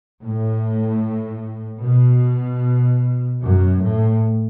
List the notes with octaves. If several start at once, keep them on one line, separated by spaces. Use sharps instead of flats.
A2
B2
F#2
A2